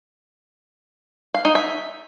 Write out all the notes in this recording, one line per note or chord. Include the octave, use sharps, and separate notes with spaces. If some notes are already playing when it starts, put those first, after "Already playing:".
F5
D#4
E5